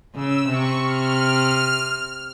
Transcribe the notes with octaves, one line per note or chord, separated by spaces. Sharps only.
C#3 E6
C3 C#6
F6